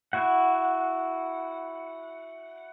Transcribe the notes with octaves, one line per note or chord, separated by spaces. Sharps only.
E4 F#4 F#5